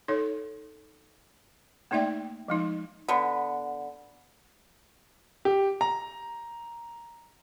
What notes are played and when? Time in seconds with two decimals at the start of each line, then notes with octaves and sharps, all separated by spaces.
0.08 D#4 A4 C#5
1.91 A3 A#3 D#4 D5 E5 G5
2.48 F3 G#3 D#4
3.08 D3 B3
5.45 G4
5.81 A#5